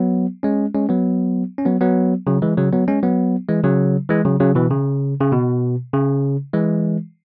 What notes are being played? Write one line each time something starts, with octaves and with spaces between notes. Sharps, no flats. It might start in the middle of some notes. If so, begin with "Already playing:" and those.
Already playing: F#3 B3
G#3 C#4
G#3 C#4
F#3 B3
C#4
F#3 B3
F#3 B3
C#3 F#3
E3 G#3
C#3 F#3
F#3 B3
G#3 C#4
F#3 B3
E3 G#3
C#3 F#3
E3 G#3
C#3 F#3
C#3 F#3
B2 E3
C#3
C#3
B2
C#3
E3 G#3